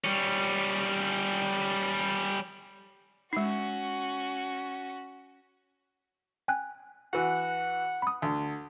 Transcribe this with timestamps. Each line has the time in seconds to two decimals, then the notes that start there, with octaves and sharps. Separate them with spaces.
0.04 G3 C#4
3.33 G#3 C#4 D#4 F#4
6.48 G5 G#5 F#6
7.13 E3 F#4 F#5
8.02 B5 D#6
8.22 D2